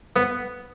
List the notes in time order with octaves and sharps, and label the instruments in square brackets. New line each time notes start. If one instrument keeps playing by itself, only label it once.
[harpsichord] B3